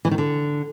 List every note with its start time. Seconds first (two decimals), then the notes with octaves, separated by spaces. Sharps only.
0.05 E3
0.11 D#3
0.18 D3